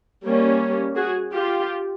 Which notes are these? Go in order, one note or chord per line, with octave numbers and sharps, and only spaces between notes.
G3 A#3 C#4
F#4 G#4
F4 G4